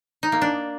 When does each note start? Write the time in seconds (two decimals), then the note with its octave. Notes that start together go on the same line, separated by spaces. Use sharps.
0.23 D#4
0.32 A#3
0.42 D4